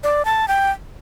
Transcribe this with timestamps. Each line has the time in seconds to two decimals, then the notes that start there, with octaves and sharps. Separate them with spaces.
0.03 D5
0.25 A5
0.48 G5